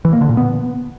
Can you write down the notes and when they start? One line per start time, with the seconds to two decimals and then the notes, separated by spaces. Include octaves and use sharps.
0.05 E3
0.13 A#3
0.21 D3
0.29 A#2
0.37 B3